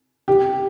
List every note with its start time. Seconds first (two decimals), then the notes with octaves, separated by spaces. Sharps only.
0.28 G4